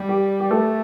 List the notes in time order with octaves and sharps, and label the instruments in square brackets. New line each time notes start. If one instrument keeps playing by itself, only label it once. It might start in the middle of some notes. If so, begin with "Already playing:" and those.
Already playing: [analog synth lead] G3
[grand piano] G4
G4
[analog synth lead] A3 [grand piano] A4